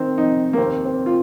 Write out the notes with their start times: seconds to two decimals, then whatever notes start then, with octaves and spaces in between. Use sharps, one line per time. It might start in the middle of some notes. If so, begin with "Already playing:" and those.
Already playing: D#3 C4
0.18 F2 D#4
0.53 A#3
0.58 D#2 C4
0.85 C4
1.06 F4